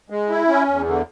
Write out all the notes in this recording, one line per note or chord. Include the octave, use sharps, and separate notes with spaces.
G#3
E4
C#4
E2
D3